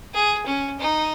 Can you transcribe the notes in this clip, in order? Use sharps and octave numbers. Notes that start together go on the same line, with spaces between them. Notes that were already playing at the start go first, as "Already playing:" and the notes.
G#4
C#4
D#4